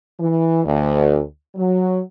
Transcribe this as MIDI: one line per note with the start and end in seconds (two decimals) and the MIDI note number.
0.19 0.62 52
0.65 1.20 38
1.56 2.00 54